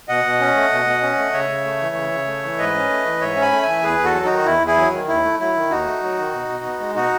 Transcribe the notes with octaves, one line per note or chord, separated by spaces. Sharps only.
B2 D#5 F#5
B2
C#4
A3
B2
B2
C#4
A3
C#3 C#5 E5
C#3
A3
E3
C#3
C#3
A3
E3
G#2 B4 D#5
C#4
A3
E3
G#2 C#5 E5
C#4
G#5 B5
A3
E3 E5 G#5
E2 G#4 B4
E2
F#4 A4
F#3
D#4 F#4
D#3
E2 E4
E2 E4 G#4
F#3
D#3
D#2 E4
A3
F#3 E4
D#3
D#2 D#4 F#4
A3
F#3
D#3
B2
B2
B3
G#3
B2 D#4 F#4